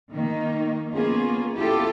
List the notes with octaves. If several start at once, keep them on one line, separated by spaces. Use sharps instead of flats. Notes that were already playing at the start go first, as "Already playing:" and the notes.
D#3 A#3 D#4
A#3 B3 C#4 F4 G#4
B3 E4 F4 G4 A4